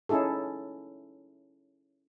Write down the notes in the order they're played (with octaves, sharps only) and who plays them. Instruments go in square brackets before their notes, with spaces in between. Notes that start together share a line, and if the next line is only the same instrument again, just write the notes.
[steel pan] C#4 D#4 E4 G#4 A4